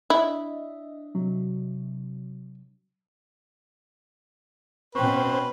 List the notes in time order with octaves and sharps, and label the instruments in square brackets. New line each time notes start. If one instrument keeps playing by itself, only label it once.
[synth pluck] D4 D#5 E5 [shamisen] E4
[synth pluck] C3 F#3
[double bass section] B2 C#4 [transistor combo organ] C4 [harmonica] B4 [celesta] G5 C#6